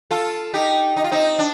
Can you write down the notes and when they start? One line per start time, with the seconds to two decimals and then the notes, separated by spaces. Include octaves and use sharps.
0.11 F4 A4
0.54 D#4 G4
0.97 D#4
1.04 F4
1.11 C4 D#4
1.39 D4